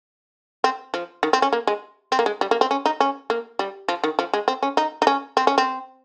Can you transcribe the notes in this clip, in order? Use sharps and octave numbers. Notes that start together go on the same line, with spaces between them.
C4
F3
D#3
C4
C#4
A#3
G#3
C4
A#3
G#3
G3
A#3
C4
C#4
D#4
C#4
A#3
G3
F3
D#3
F3
G#3
C4
C#4
D#4
D#4
C#4
C4
C#4
C4